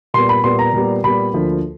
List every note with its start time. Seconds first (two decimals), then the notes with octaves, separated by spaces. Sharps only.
0.14 A#2 G3 B3 C6
0.29 B5
0.44 A#2 G3 B3 C6
0.59 A#5
0.73 A#2 G3 B3
1.04 A#2 G3 B3 B5
1.33 D2 D3 F3 A#3